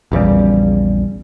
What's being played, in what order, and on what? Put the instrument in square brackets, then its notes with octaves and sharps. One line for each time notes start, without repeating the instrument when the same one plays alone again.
[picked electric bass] A#1 E2 C#3 G3